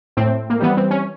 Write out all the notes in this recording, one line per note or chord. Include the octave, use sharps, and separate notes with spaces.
A2 C4
A#3
E3 G3 B3
C4
C#4